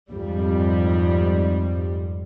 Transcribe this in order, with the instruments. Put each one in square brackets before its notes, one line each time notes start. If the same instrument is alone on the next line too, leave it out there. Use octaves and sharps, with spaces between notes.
[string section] F2 G#2 G3